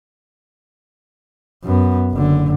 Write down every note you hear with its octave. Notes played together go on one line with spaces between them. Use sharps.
F#2 B3
F#1 D3